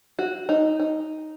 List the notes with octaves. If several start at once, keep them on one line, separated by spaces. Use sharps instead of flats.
F#4
D#4
D#4